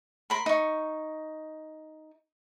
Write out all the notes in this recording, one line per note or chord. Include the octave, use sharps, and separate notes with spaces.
A#4 B5 C6
D#4 C#6